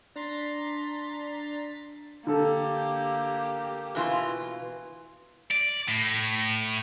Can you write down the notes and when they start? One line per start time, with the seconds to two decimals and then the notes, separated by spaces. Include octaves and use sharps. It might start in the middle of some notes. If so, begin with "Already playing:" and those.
0.16 D4 A#5 C6 A6 B6
2.27 D3 A#3 G4 A4
3.95 B2 E3 F4
5.51 D5
5.88 A2